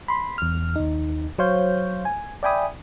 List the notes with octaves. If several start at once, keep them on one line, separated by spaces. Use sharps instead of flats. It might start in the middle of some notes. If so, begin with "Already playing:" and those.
B5 C6
E2 F6
D#2 D#4
F#3 C5 C#5 F5 G6
G#5
D5 E5 G5 G#5 B5 D#6